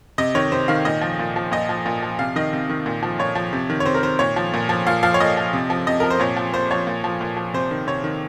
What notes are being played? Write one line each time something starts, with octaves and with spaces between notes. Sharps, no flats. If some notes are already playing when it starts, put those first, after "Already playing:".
C3 D#5
D#3 C#5
C3 C5
D#3 F5
A#2 D#5
F3
A#2
F3
A#2 D#5
F3
A#2
F3
C3 F5
D#3 D#5
C3
D#3
A#2
F3
A#2 C#5
F3
C3
D#3
C#5
C3 C5
A#4
D#3 C5
A#2 C#5
F3
A#2
F3
A#2 F5
F3 F5
C#5
A#2 D#5
F3
C3
F3
C3 D#5
F3 A#4
C5
A#2 C#5
F3
A#2 C5
F3 C#5
A#2
F3
A#2
F3
C3 C5
D#3
C3 C#5
D#3